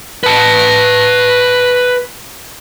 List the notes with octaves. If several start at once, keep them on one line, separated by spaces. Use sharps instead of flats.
B4 A5